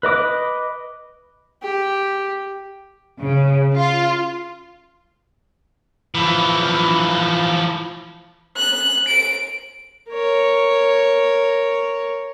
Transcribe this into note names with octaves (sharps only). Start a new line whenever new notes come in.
B4 D#5 D6 D#6
G4
C#3
F4
E3 F3
F#6
D7
A#4 C#5